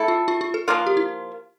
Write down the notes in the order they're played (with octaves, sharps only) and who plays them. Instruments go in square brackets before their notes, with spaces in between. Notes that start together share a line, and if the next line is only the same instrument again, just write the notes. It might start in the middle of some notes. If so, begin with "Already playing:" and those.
Already playing: [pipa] A3 E4 A4
[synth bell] F4
F4
F4
A4
[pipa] F3 A#3 F4 [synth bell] A#4
[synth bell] G4
E4